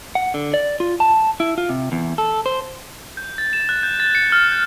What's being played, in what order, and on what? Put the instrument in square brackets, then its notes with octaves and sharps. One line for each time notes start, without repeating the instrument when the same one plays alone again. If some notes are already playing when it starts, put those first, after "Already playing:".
[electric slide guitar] F#5
D3
D5
F4
A5
E4
F4
C3
E2
A4
C5
[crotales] G6
A6
E7
F#6
G6
A6
C#7
F6
G6